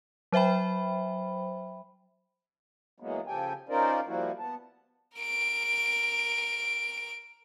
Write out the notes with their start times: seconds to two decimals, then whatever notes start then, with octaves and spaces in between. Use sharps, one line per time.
0.32 F#3 C5 E5 G5 B5
3.00 E3 F#3 G#3 A#3 B3
3.27 C#3 F3 G4 A4 G5 G#5
3.69 C#4 D#4 F4 A#4 C5 D5
4.07 F3 G3 A#3 E4 F#4
4.39 B3 A5
5.18 A#4 D7